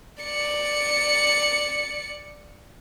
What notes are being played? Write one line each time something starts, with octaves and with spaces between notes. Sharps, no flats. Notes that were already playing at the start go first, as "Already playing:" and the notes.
D5 C#7